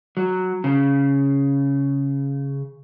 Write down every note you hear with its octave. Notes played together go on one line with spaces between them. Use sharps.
F#3
C#3